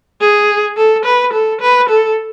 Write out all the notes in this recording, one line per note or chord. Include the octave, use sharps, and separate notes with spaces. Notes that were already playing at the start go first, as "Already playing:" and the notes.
G#4
A4
B4
A4
B4
A4